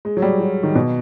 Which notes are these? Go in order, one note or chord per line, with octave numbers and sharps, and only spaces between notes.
G#3
F#3
G3
F#3
D#3
B2